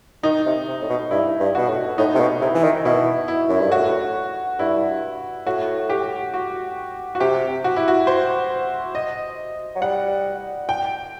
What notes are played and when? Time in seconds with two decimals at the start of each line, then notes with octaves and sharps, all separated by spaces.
0.23 D#3 D#4
0.46 C3
0.68 C3
0.81 A2
0.89 B2
1.11 G2 E4
1.40 G2
1.55 B2 F#4
1.69 A2
1.98 A2 D#4
2.15 C3
2.20 B2
2.41 C3 E4
2.55 E3
2.64 D#3
2.85 B2 E4
3.28 E4
3.49 F#2
3.60 G2
3.72 A2 F#4
4.59 G2 E4
5.46 A2 F#4
5.89 G4
6.34 F#4
7.15 F#4
7.20 C3 G4
7.64 F#4
7.76 E4
7.88 F#4
8.07 C5
8.95 D#5
9.76 F#3
9.82 G3 F#5
10.69 G5